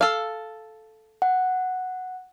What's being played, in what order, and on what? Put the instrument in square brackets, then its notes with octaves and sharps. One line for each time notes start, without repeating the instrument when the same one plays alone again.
[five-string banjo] A4 F5
[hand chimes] F#5